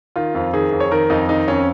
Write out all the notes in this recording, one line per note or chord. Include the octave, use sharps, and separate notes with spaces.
D#3 F4
F2
D#3 G#4
F2
C#5
D#3 A#4
F2 D#4
D#3 D#4
F2 C#4